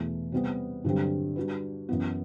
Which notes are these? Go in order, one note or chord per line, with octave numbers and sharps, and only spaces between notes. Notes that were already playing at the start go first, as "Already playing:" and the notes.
Already playing: E2 B2 A3
C3 G3 B3
G2 D3 F#3 C4 G4
G3 D4 F#4 B4
F#2 E3 B3